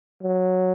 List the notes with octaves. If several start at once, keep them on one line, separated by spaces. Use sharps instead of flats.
F#3